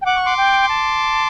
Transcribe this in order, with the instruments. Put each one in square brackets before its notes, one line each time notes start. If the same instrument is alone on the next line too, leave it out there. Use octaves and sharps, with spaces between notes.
[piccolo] G5
[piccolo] F#5 [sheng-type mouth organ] D6
[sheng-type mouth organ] C#6
C6 D6
[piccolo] G5
A5